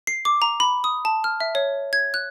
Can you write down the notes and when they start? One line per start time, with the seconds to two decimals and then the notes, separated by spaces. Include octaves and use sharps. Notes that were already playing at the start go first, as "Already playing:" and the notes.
0.07 C7
0.25 D6
0.42 A#5
0.60 B5
0.84 D#6
1.05 A5
1.24 F6
1.40 E5
1.55 C#5
1.93 G#6
2.14 F#6